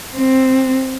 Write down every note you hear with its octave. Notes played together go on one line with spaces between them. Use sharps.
C4